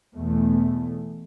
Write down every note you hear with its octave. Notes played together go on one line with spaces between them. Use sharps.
E2 B2 A3